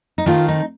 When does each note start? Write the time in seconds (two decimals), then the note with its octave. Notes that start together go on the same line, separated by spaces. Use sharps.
0.18 D#4
0.26 D#3 A3 C4 D4 F4
0.48 D#4